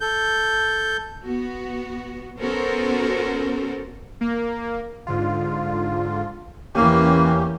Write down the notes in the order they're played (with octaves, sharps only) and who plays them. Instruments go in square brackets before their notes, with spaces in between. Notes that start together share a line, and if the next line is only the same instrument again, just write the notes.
[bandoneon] A4 G6
[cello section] B3 F#4
B3 C#4 F#4 A4 A#4 C5
[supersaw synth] A#3
[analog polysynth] G#2 D3 F4
[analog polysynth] E2 C#4 G4 [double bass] E3 A#3